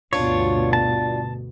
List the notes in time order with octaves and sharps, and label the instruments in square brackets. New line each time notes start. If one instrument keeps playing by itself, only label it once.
[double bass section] D2 G2 B2 [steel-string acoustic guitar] D4 F4 [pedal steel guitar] C#5
[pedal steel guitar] A5